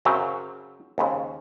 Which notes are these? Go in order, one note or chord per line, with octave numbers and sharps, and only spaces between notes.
F#2 C#3 F#3 C4
D#2 C#3 G#3 C4